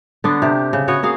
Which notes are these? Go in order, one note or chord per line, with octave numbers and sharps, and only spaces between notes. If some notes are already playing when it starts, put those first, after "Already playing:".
D3 B3 D4
C3 G4
C#3
B3 F#4 C#5
A#3 F#4 G#4 F5